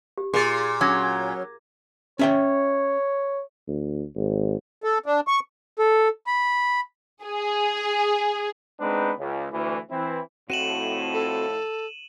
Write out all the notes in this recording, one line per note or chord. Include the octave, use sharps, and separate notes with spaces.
G4
A#2 G#4 C6 A6
F#3 C#4 D6 G#6 A#6
C#4 C#5 E5 G5
D2
G#1
A4
D4
C#6
A4
B5
G#4
G#3 B3 C4 D4 D#4 B4
C#2
D2 E3
E3 C4 E4 B4
F2 A2 C4 F#4 D#7 E7 F#7
A4